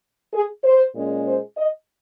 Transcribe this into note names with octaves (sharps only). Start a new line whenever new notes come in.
G#4
C5
A#2 G#3 C#4
C5
D#5